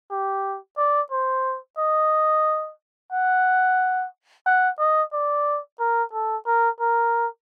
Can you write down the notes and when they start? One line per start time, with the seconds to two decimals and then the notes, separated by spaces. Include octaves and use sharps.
0.11 G4
0.78 D5
1.11 C5
1.78 D#5
3.12 F#5
4.46 F#5
4.79 D#5
5.12 D5
5.80 A#4
6.13 A4
6.46 A#4
6.80 A#4